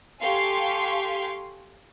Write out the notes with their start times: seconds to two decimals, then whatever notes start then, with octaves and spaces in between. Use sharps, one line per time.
0.22 G4 A4 F5 G#5 C6 C#6